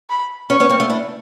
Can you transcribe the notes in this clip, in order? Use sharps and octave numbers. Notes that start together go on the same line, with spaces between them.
B5
B3 C#4 C#6
B3 C#4
A#3 C4
A3 B3
D4 E4